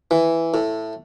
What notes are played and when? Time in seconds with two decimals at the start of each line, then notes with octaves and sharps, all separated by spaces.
0.11 E3
0.54 A2